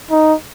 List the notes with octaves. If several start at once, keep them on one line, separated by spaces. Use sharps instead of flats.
D#4